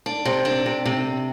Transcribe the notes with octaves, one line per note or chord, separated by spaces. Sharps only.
D4
C3
D4
C3
C3